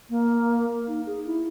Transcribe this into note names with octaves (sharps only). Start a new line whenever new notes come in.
A#3
D#4
G#4
E4